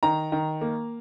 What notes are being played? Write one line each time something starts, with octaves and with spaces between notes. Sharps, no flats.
D#3 A#5
D#3
A#3